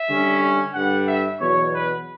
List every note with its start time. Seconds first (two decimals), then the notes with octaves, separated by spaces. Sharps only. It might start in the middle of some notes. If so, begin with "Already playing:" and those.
Already playing: E5
0.09 D3 G3 C#4
0.74 G2 D3 G3 F#5
1.07 E5
1.39 E2 B2 F#3 C#5
1.72 B4